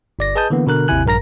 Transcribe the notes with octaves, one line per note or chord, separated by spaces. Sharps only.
G1 D5 A#6
G#4 B4 D#5 A5 D#6 G6
D3 E3 A#3 B3
B2 D3 A#4 F#6
G#1 D#2 C3 E4 G#5 F#6
A#1 G2 A#4 A#5 A#6